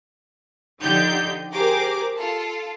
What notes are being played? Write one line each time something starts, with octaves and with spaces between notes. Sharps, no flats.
D3 F3 D#4 G4 G6
G4 G#4 A#4 C5 D6
F4 A4